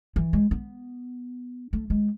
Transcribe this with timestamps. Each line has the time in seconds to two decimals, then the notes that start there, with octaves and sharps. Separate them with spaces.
0.16 E3
0.33 G#3
0.51 B3
1.73 A3
1.90 G#3